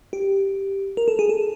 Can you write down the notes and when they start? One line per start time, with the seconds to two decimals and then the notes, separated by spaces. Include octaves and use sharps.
0.13 G4
0.97 A#4
1.08 A4
1.19 G#4
1.29 A4